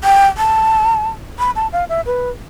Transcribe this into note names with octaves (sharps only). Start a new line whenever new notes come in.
G5
A5
B5
A5
F5
E5
B4